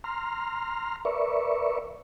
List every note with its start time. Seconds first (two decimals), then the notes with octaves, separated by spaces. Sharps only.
0.04 A#5 C6 F6
1.05 A#4 B4 D5 E5 C#6